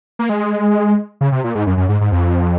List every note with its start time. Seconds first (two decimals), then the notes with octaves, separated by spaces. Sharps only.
0.19 A#3
0.29 G#3
1.21 C#3
1.32 C3
1.44 A#2
1.55 G#2
1.67 F#2
1.77 F#2
1.89 G#2
2.01 G#2
2.12 F2